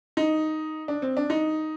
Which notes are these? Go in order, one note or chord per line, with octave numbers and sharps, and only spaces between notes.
D#4
D4
C4
D4
D#4